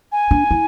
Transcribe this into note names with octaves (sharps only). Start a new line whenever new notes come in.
G#5
D4
E4